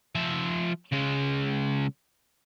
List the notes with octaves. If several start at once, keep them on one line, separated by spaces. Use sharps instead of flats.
F3 E5
C#3 G#3